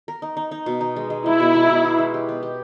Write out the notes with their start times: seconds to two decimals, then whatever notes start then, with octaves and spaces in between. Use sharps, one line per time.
0.08 A#4
0.22 D#4
0.37 D#4
0.51 D#4
0.66 B2
0.81 D#4
0.96 G#3
1.10 G#3
1.25 D#4 E4
1.40 B2
1.55 B2
1.70 B2
1.84 B3
1.99 G#3
2.14 G4
2.29 B3
2.43 G4